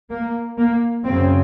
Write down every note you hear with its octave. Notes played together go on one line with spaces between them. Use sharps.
A#3
A#3
F#2 C#3 C4